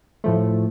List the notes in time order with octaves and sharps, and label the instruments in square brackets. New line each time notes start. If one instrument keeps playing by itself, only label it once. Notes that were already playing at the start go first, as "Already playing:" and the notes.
[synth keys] A2 F3 A3